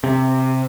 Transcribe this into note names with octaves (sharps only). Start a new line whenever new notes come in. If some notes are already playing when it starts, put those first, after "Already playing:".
C3